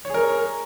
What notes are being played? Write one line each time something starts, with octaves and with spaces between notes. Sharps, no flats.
G#4 A#4 C#5